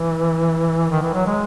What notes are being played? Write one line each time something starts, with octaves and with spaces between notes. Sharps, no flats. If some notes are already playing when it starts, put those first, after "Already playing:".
Already playing: E3
D#3
E3
F#3
G#3